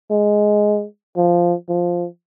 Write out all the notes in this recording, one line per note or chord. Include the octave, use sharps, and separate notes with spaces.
G#3
F3
F3